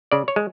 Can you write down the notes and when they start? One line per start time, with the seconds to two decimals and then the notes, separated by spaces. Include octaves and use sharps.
0.12 C#3 D5
0.28 C#5
0.36 G#3